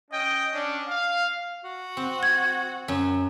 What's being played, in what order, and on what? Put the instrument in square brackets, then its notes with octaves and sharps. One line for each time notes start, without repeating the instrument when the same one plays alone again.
[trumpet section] C#4 D#5 G5
C#4 D4
F5
[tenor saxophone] F#4
[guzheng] C4
[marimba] G#6
[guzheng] F#2